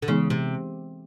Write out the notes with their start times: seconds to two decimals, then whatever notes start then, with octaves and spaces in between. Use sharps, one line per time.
0.02 D3
0.08 C#3 E3 G#3 B3 D#4 G#4
0.30 C3